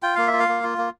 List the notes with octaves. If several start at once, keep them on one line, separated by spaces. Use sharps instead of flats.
F4 G5
A#3 F5
E5
F4
F5
A#3
F4
A#3